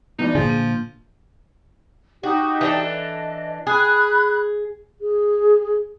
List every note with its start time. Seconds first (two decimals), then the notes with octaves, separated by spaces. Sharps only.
0.19 B2 E3 D4 D#4
0.35 A#2 D3 F3 G#4
0.49 D#7
2.23 D#4 F#4 G4
2.61 E3 D4 A4
2.83 D#5
3.67 G#4 B5 F#6
5.01 G#4